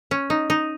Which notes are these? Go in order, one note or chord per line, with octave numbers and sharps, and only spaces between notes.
C#4
D#4
D#4